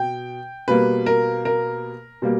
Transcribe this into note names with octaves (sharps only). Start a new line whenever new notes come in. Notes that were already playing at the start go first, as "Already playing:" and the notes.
Already playing: B2 G5
B2 G3 A#3 B4
A#4
A#4
B2 G3 A#3